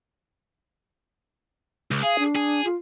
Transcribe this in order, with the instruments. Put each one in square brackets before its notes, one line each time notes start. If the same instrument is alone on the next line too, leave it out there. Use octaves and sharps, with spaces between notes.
[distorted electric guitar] C#2
[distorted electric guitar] G#4 [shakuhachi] F5
[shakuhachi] D4
[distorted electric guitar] G#4
[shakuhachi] F4